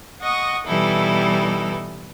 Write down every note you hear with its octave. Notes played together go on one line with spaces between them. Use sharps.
D#5 F#5 C#6 D#6
B2 E3 G3 D#4 E4 A4